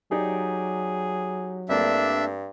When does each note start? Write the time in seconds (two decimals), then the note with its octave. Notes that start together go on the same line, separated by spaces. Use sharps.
0.12 F#3 D#4 G4 G#4 D5
1.69 G2 A3 A#3 C4 D4 E5